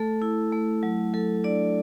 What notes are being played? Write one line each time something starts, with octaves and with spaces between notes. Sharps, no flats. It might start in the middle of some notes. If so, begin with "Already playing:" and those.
Already playing: A3 A4
E4
A3
F#3
F#3 A4
D4 D5